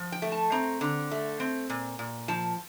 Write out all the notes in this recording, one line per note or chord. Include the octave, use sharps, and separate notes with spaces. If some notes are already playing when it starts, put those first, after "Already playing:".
Already playing: F3
G5
A3
A5
C4 A#5
D3
A3
C4
A#2
A#2
F3 A5